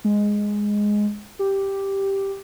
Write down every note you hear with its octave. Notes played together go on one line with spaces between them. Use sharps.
G#3
G4